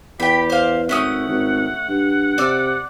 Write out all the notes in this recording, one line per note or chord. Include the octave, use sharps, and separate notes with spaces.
E2 G4 G5 B5
C5 F5
G#1 A3 C#4 F#5 D#6
G#1
G2
C3 D5 D6 E6